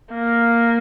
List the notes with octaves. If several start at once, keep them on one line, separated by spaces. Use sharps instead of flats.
A#3